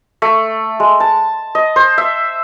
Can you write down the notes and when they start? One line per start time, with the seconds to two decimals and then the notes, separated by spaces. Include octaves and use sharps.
0.22 A3
0.80 G#3
1.00 A5
1.55 D#5
1.76 C5
1.98 E5